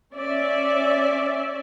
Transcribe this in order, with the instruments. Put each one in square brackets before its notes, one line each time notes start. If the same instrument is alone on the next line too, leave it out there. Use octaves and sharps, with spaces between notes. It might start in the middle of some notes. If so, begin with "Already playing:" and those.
[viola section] C#4 D5 E5